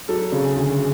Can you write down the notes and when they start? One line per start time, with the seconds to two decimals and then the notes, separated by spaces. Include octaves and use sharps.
0.08 F#3 A4
0.32 C#3
0.44 G#4
0.56 D2